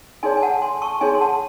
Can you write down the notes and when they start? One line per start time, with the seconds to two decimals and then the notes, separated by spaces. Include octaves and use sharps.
0.23 D#4 G#4 C#5 G#5 C6
0.37 G#5
0.42 F#5 A5
0.62 G#5 C6
0.82 A5 C#6
1.01 D#4 G#4 C#5 G#5 C6
1.15 C6
1.21 F#5 A5